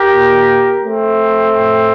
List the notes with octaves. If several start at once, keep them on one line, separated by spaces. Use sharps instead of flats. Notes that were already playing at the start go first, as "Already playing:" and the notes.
Already playing: G4 A#4
A#2
A3 C4
A2